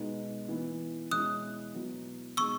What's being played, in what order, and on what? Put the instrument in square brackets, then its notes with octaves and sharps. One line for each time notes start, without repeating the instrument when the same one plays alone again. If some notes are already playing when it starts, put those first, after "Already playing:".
Already playing: [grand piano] B2 G#3 B3 D#4
E3 B3 E4
[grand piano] B2 G#3 C#4 E4 [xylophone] D#6 F#6
[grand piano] B2 F#3 B3 E4
[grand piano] B2 G#3 D#4 G#4 [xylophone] C#6 E6